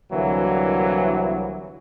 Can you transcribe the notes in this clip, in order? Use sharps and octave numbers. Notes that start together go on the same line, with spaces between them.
C2 D3 E3 F#3 A#3